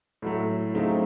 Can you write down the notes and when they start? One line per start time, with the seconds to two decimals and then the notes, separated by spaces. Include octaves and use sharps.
0.22 A2 F#3 A3
0.75 C#3 F#3 A3 C4 D#4